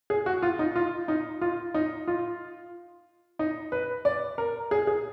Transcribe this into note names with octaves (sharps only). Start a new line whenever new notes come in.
G#4
F#4
F4
D#4
F4
D#4
F4
D#4
F4
D#4
B4
D5
A#4
G#4
G#4